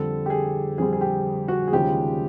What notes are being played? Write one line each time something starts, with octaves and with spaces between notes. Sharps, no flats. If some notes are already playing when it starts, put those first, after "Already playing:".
Already playing: F2 D3 G3 A4
G4
G#4
F2 D3 G3 G#4
G#4
G4
F#4
G#4
D#2 C#3 F3 G#3 G4